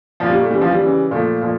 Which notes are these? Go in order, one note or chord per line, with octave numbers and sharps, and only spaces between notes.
A#2 F3
G3
A3
C#3 E3 G3
F3
G3
C#3 E3
A#2 F3 A3
A#2 F3